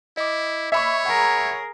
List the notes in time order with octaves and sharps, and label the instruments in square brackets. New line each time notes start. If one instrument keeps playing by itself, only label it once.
[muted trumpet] E4 [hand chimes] D#5 D6
[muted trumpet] C#5 [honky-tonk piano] E5 B5 C#6
[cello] G#4 A#4 [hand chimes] F#5 A#5